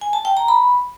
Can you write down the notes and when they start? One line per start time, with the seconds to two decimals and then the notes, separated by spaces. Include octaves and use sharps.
0.01 G#5
0.13 A5
0.25 G5
0.37 A#5
0.48 B5